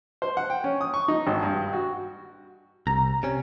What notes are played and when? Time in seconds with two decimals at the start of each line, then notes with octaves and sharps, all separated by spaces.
0.22 C5
0.37 F#5
0.50 G5
0.64 C#4
0.81 D#6
0.94 C#6
1.08 D#4
1.27 G#1
1.43 G2
1.73 F#4
2.87 C2 A#5
3.23 C3 C#4